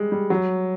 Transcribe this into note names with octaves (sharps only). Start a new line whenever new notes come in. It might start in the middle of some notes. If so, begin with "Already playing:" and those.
Already playing: G3 G#3
G3
F#3